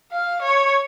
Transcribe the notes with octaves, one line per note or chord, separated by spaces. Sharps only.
F5
C#5